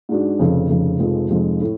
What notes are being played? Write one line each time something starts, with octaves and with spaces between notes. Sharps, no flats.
G#2 G#3 D4 F#4
F1 F2 C#3
F1 F2 C#3
F1 F2 F3 G#3
F1 F2 F3 G#3
A2